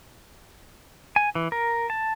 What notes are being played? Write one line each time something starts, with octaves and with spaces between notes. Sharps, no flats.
G#5
E3
A#4
A5